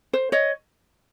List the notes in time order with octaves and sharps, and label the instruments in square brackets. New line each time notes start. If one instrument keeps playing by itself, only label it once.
[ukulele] C5
C#5 D#5